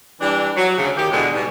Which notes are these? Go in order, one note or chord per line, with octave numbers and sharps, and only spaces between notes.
E3 G3 D4
F#3
D2 C#3
D#3 G4
E2 B2 D3 G#3
G#2 B2 G3